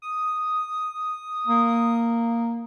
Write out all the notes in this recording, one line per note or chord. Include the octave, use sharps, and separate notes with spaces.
D#6
A#3